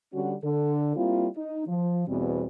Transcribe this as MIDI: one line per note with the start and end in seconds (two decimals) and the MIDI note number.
0.13 0.33 50
0.13 0.33 55
0.13 0.33 61
0.13 0.33 66
0.44 0.94 50
0.44 0.94 69
0.96 1.27 55
0.96 1.27 58
0.96 1.27 60
0.96 1.27 64
0.96 1.27 65
1.36 1.64 63
1.67 2.07 53
2.07 2.45 40
2.07 2.45 47
2.07 2.45 55
2.07 2.45 60